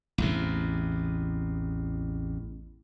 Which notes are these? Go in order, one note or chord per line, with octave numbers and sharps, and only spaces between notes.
A1 E2 C3